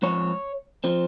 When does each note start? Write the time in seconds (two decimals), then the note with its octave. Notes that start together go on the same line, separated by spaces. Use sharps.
0.02 G#2 F3 C4 C#5
0.84 F3 C4